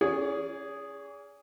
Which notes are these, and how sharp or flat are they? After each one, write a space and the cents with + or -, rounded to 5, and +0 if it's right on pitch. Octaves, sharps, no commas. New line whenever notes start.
C#4 +0 G#4 -10 D5 -45